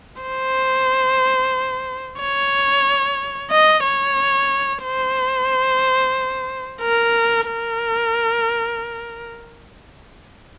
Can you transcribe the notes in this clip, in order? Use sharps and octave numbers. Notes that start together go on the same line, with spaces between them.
C5
C#5
D#5
C#5
C5
A#4
A#4